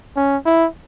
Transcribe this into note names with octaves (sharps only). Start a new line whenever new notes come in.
C#4
E4